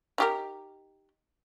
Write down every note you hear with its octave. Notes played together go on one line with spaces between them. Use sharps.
D#4 G4 A#4